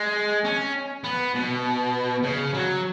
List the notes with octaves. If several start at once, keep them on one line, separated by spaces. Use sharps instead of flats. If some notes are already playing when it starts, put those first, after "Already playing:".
Already playing: G#3
C#4
B3
B2
C#3
F#3